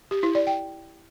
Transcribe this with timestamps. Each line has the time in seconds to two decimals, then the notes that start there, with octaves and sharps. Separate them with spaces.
0.11 G4
0.23 E4
0.35 D5
0.47 G5